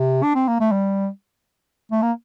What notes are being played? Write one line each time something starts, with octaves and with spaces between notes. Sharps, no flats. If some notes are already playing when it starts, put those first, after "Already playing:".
Already playing: C3
D4
C4
A#3
A3
G3
A3
A#3